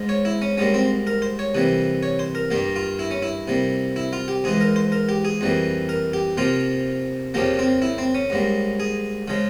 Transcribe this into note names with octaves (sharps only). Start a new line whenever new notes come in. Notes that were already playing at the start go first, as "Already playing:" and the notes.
Already playing: G#2 F3 G#3
C#5
E4
C#4
G#2 G3 A#3 C#4
C4
A#4
C5
C#5
C3 E3 G3 A#3
C#5
C5
A#4
G2 G3 A#3 G4
F4
E4
C#4
E4
C3 G3 A#3
E4
F4
G4
G#2 E3 G#3 G#4
A#4
C5
A#4
G4
G#4
F2 E3 G3 A#3
A#4
G4
C3 F3 A#3 F4
F2 C#3 F3 A#3 G4
C4
E4
C4
C#4
G#2 G3 A#3
G#4
C#3 F3 G#3